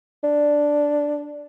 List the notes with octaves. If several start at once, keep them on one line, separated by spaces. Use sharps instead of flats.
D4